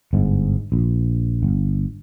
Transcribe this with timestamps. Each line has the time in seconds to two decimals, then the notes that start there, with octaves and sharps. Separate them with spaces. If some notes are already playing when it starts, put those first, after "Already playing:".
0.13 G1 G#2
0.72 A#1
1.43 G1